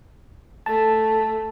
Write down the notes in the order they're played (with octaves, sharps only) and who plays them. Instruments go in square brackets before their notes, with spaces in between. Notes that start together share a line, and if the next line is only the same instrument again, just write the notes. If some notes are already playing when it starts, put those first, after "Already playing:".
[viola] A3 [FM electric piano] A5